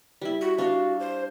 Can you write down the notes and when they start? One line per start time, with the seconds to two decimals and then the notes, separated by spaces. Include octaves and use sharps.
0.21 G3 E4
0.41 F#4
0.58 D4 F#4 F5
1.00 C5